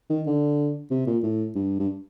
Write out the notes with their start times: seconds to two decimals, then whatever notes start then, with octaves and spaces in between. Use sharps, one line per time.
0.10 D#3
0.26 D3
0.91 C3
1.07 A#2
1.23 A2
1.55 G2
1.79 G2